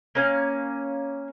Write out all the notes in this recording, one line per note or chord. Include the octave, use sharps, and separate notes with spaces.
A#3 C#4 F5